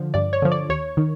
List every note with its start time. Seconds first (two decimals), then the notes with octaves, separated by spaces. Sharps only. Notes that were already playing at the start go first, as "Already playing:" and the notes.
Already playing: D3 F3
0.14 G2 D5
0.33 C#5
0.42 D3 F3
0.52 D5
0.69 D#2 C#5
0.97 D#3